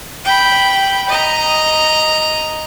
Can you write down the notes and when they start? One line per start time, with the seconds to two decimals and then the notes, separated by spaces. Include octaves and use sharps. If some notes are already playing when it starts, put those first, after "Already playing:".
0.25 G5 B5
1.08 D#5 A#5